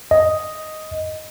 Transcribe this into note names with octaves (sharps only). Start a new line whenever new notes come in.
D#5